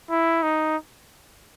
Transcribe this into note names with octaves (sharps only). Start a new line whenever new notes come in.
E4
D#4